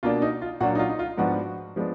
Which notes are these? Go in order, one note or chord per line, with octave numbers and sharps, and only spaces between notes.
B2 A#3 D4 F4
D#4
F4
A#2 F#3 D4 F#4
D#4
F4
D#4
F4
G#2 F3 B3 D4 F#4
F3 G#3 B3 D4